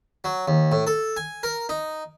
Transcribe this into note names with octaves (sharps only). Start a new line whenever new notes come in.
F#3
D#2
A2
A4
G#5
A#4
D#4